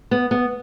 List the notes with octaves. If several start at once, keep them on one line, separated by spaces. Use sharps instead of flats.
B3
B3